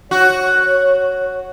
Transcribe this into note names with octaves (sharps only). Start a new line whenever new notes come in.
F#4 C#5